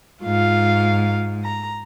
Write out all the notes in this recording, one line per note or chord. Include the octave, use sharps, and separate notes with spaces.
G#2 F4 F5
A#5